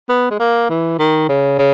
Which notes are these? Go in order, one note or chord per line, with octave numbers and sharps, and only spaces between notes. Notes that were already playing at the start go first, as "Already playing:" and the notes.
B3
G#3
A#3
E3
D#3
C#3
C#3